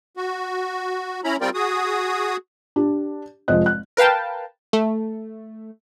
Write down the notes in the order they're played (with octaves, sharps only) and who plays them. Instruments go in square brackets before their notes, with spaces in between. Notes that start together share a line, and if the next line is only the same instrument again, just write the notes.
[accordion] F#4
C#4 E4 A#5 B5
G3 C4 F4 A#4 D5 G5
F#4 G#4 D#6
[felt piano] D4 G4
F1 F3 G#3 C5 D#5 F#6
F#6
[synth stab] A#4 B4 F5 G5 A5
A3